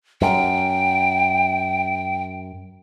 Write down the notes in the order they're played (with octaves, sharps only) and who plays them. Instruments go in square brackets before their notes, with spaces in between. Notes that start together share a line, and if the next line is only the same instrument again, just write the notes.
[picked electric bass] F#2 [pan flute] G5